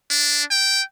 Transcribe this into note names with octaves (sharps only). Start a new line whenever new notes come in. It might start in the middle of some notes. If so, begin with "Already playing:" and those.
D4
G5